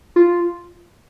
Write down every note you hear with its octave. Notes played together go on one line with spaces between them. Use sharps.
F4